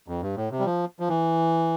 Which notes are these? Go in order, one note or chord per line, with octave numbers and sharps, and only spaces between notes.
F2
G2
A2
C3
G3
F3
F3
E3